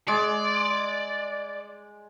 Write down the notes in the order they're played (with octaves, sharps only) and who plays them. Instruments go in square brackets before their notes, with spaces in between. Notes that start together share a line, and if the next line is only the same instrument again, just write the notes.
[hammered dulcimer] G#3 [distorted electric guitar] D5